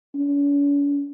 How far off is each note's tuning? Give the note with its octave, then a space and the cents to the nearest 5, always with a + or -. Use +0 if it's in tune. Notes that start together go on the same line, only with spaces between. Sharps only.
C#4 +45